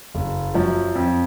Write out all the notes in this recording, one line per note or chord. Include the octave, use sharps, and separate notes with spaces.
F#1
F#2 F3
F2